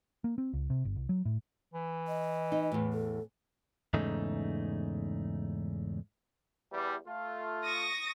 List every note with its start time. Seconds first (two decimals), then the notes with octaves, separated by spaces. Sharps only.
0.24 A#3
0.38 C4
0.53 C#2
0.70 C3
0.85 G1
0.96 C2
1.09 F#3
1.25 A2
1.74 E3
2.08 D#5
2.52 D#4
2.72 E2 A2
2.93 A4
3.94 E2 G#2 C#3 A3 D#4
6.72 E2 E3 G3
7.07 A3 F4
7.65 C#6 D#6 A#6